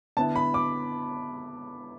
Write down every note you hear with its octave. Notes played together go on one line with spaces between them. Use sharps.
D3 B3 E4 A5
B5
D6